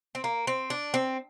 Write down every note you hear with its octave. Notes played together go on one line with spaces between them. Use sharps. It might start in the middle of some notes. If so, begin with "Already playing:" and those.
C4
A#3
C4
D4
C4